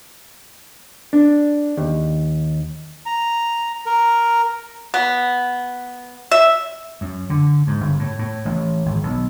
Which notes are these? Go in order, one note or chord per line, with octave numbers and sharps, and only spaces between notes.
D4
D#2
A#5
A#4
B3
E5
F#2
D3
G#2
G1
A2
A2
A1
G#1
B1